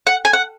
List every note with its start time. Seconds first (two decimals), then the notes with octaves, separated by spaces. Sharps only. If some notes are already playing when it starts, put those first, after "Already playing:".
0.07 F#5
0.25 G#5
0.33 F#5